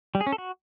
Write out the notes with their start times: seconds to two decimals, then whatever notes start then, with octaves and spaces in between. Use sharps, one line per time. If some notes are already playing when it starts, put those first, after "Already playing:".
0.15 G3
0.21 G#4
0.27 C#4
0.32 A4
0.38 F#4